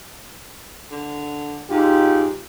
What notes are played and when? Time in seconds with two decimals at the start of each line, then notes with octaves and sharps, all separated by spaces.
0.91 D3
1.70 G#2 D#4 F4 G4